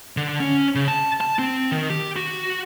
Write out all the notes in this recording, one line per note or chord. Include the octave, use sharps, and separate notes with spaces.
D3
C#4
C#3
A5
A5
C4
D#3
G4
F#4